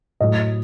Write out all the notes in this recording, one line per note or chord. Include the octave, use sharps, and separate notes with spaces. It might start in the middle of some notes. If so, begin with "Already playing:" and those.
A2 F#3 A3 D#5